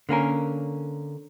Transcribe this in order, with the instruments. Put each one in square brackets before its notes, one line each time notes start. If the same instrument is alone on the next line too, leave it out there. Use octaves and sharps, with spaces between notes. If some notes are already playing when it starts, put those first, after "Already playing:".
[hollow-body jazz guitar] D3 A#3 C#4 A#4